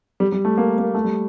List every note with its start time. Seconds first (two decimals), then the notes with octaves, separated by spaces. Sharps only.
0.20 G3
0.32 G3
0.45 A3
0.58 A#3
0.78 A#3
0.94 A3
1.04 G3